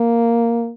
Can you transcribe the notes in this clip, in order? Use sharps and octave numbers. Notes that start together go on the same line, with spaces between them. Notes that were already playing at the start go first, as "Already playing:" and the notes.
Already playing: A#3